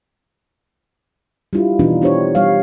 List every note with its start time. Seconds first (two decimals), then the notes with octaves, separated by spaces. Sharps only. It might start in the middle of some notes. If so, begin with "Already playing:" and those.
1.53 G3 D4 E4 F4
1.79 B2 E3 B3 D4 D#4 F4
2.02 B3 D4 G4 C5 C#5
2.35 G3 C#5 F5